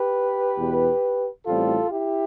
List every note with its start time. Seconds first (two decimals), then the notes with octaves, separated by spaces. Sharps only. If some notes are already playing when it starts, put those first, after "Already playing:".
Already playing: G4 B4
0.55 E2 B2 B3
1.46 A1 A2 G3 C4 F4 A4
1.91 E4 G4